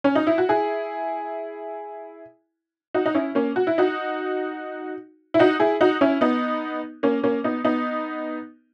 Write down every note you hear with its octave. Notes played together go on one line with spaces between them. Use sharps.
C#4
D#4
E4
F#4
E4 G#4
D#4 F#4
D#4
C#4 E4
A#3 C#4
F#4
E4
D#4 F#4
E4
D#4 F#4
E4 G#4
D#4 F#4
C#4 E4
B3 D#4
A#3 C#4
A#3 C#4
B3 D#4
B3 D#4